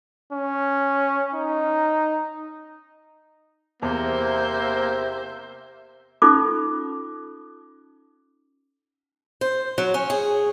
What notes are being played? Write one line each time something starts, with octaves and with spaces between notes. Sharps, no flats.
C#4
D#4
E2 C3 A#3 C5 E5
C#4 D#4 F4 A4 D6
C5
F#3
C#4
G#4